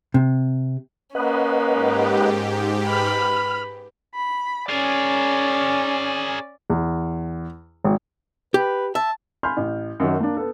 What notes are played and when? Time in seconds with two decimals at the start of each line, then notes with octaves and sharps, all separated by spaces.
0.14 C3
1.15 A#3 C#4 B4 D#5 F#5
1.69 G#2 G4
2.87 B4 B5 F6
4.14 B5
4.69 C#4 G#4 A#4 D5
6.70 E2
7.84 G#1
8.54 G4 B4
8.95 E5 A5
9.43 G#5 B5 C6 F6 G6
9.57 A1
10.00 F#2 D#3 F#3
10.20 A#3 D4
10.37 B3 A4